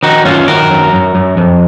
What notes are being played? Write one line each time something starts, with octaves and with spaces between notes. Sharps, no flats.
D#3 D#4 F#4
F#2 C#4 F4
D#3 F#4 A#4
F#2
F#2
F#2
F2